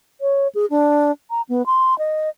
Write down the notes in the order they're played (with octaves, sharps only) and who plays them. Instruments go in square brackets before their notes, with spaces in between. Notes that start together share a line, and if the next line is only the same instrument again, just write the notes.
[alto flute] C#5
G#4
D4
A#5
B3
C6
D#5